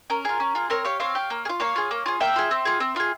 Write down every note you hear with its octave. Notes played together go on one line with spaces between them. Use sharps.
C#4 A#4
F4 G#4
C#4
F4 G#4
C4 A#4 C#5
G4 C#5 F5
C4 C#5 F5
G4
A#3
G#4
F4
A#3 C#5 F5
F4 G#4
A#3
F4 G#4
A#3 E5 G5
F4 G#4
C4
F4 G#4
C4
F4 G#4